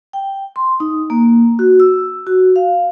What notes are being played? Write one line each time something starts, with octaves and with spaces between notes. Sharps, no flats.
G5
C6
D#4
A#3
F#4
E6
F#4
F5